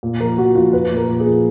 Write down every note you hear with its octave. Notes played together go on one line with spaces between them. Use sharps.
A#2
F3 A#4
F3 F#4
F3 F4
F3 B4
A#2
A#4
A#2
G#4
F3